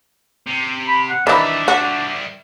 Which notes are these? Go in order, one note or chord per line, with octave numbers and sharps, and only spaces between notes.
C3
B5
F#5
D#3 E3 G3 D4 E5
F#4